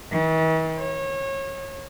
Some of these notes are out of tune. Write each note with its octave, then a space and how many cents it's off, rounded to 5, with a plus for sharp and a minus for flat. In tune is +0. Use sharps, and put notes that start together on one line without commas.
E3 -45
C#5 -30